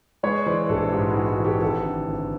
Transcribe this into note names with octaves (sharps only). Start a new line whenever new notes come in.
G#3 B4 C#5
E3 C5 D5
A#1 G4 A4
G#2 F4 G4
E4 F#4
G#3
E4 F#4
E3
G4 A4
G#1 G4 A4
D3
G#1